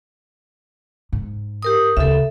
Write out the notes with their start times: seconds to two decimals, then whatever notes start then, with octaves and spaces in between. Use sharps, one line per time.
1.12 G#2
1.63 G4 A#4 D#6
1.97 D2 C#3 A4 E5